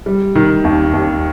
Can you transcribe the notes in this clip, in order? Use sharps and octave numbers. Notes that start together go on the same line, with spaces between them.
G3
D#3
D#2
D#2